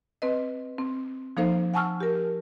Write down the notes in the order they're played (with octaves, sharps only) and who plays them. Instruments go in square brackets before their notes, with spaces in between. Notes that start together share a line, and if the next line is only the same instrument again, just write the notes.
[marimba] C4 B4 D#5
C4
F3 A#3 D#4 A4 C5 F5
F#5 G#5 A5 C#6 E6 F6
G4 A#4